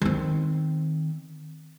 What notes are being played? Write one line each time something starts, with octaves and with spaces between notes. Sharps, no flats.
D#3 C4